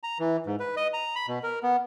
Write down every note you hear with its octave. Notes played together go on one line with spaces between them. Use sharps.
A#5
E3
G#2
B4
D#5
A#5
B5
B2
A#4
B3